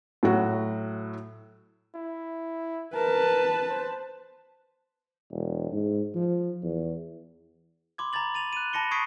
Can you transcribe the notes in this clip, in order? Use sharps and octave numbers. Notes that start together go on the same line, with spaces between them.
A2 F#3 F#4
E4
A#4 B4 A5
C5
E1
G#2
F3
E2
B5 C6 D6 G#6
A#5 B5 G#6 A6 F#7
A6 D#7 F7
F#6 D#7
A5 B5 A#6 C#7 G7
C#6 D#6 G#6 B6 C7 D7